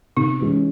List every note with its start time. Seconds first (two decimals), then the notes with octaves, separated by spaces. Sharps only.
0.17 C3 D#4
0.40 E3 G#3 C#4